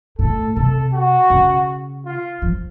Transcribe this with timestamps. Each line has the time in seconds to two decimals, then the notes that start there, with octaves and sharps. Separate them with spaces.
0.19 A2 A4
0.55 C3 A4
0.93 F#4
1.30 C#3
2.06 F4
2.42 F3